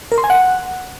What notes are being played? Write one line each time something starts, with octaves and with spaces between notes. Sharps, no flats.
A#4
C6
G#5
F#5